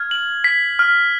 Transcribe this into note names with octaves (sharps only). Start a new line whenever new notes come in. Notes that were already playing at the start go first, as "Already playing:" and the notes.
Already playing: F6 G#6
F#7
B6
F6